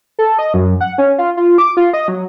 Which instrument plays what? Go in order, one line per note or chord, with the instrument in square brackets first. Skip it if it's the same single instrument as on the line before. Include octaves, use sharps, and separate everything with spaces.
[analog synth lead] A4
D#5
F#2
F#5
C#4
F4
F4
D6
F4
D#5
F#3